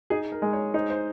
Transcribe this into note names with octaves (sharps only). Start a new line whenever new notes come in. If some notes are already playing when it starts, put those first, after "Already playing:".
D#4 G#4
A#4
G#3
C#5
D#4 C5
C5